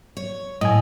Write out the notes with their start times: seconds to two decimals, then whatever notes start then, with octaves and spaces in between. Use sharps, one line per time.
0.17 C#5
0.61 A2 D#5 G#5